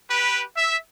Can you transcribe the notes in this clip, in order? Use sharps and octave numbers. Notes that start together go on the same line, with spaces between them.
G4 B4
E5